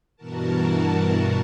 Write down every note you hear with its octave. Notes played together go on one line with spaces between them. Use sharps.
G2 B2 E3 F#4 A#4 A5